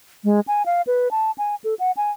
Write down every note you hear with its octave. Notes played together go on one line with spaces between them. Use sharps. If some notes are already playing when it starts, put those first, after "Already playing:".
G#3
G#5
F5
B4
A5
G#5
A4
F#5
G#5